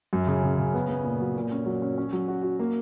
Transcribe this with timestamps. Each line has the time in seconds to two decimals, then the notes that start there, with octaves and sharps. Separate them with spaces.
0.13 F#2
0.27 C#3
0.44 C#3
0.58 C#3
0.74 B3
0.89 B3
1.04 A#2
1.21 F#3
1.36 A#2
1.51 C#4
1.66 F#3
1.82 C#4
1.98 C#4
2.13 F#3
2.28 F#4
2.43 F#4
2.59 A#3